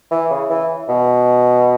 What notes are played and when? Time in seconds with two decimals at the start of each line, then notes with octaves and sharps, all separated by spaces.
0.11 E3
0.30 C#3
0.50 E3
0.88 B2